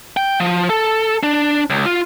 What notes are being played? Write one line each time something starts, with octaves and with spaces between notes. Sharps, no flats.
G5
F3
A4
D4
C#2
F4